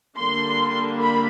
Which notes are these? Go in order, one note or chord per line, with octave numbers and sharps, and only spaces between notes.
D3 G3 A#3 D4 C6
B5